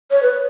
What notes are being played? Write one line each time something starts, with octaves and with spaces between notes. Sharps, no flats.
C#5
B4